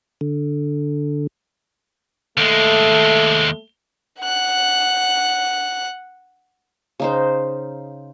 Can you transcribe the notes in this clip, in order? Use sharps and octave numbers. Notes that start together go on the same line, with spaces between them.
D3
D#2 G#3 A3
F#5 F#6
C#3 D#4 C5